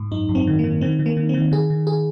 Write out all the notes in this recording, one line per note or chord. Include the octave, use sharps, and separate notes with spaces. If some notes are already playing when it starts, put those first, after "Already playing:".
Already playing: G#2
F#2 D#4
F#2
C4
D#3
D#3 A#3
D#3 C4
D#3
A#3
D#3
C4
D#3
D#3 G#4
D#3
G#4